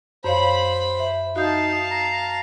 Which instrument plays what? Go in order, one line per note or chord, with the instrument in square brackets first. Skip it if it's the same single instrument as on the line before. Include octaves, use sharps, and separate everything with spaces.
[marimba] F#2 C#5 F5 [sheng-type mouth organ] C5 [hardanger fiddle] B5
[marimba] E5
[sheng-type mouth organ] D#4 [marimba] F#4 G6 [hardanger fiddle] F5 A5
[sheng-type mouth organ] A#5